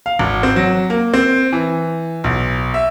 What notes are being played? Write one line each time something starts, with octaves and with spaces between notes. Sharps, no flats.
F5
G#1
C4
F#3
A#3
C4
E3
B1
E5